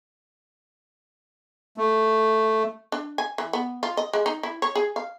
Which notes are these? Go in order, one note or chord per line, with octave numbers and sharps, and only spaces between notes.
A3
D4
G#5
E3
B3
F4
D#5
G#3
D#4
E4
C#5
G#4
F5